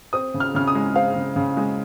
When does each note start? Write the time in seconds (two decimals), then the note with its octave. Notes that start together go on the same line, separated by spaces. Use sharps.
0.13 C4 D#6
0.34 C#3
0.40 F6
0.55 C#3 F6
0.68 D#6
0.75 G#3
0.95 C4 F5
1.15 C#3
1.36 C#3
1.57 G#3